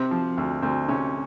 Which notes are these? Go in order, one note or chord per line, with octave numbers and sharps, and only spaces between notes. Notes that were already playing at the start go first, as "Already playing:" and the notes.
Already playing: C3 C4
F3
D2
D2 C4
C3 C#4